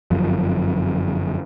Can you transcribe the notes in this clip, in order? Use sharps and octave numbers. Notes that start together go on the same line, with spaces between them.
G1 F#2 F3